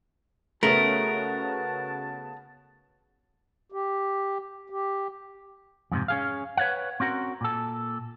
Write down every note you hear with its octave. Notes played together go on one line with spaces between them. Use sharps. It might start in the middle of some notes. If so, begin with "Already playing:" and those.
C#3 A3 B3 C#4 F#4 A#4 A5
G4
G4
F2 G#2 C3
C#4 G#4 F5
B4 C#5 D5 F5 F#5
C4 C#4 F#4 A#4
A#2 A4